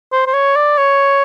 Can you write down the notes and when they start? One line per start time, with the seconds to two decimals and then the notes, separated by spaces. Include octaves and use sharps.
0.12 C5
0.27 C5
0.33 C#5
0.56 D5
0.78 C#5